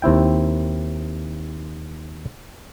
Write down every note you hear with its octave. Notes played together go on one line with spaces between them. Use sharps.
D#2 C4 E4 G5